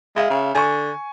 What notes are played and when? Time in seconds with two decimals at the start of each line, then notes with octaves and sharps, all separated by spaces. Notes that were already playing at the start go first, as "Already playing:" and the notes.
0.16 G#3 E5 F5
0.30 C#3
0.55 D3 G#5 C#6